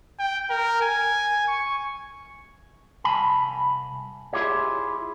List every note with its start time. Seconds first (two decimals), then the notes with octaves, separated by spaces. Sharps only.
0.20 G5
0.50 A#4
0.82 G#5
1.48 C#6
3.04 C2 G#5 A5 B5
4.33 E4 F4 G4 G#4 C#5